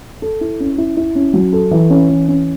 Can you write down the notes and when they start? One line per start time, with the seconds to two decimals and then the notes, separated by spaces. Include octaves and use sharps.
0.22 A4
0.41 E4
0.60 C#4
0.78 E4
0.97 E4
1.15 C#4
1.34 F#3
1.53 A4
1.71 E3
1.90 C#4
2.09 E3
2.28 C#4